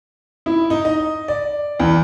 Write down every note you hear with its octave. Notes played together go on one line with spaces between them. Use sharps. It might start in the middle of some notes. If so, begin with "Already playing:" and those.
E4
D#4
D#5
D5
E2